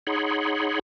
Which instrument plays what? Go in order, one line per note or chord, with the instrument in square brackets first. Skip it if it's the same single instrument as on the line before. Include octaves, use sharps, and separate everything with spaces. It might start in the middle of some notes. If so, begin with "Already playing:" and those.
[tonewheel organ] D#4 G#4 C#5 F#5 B5 C6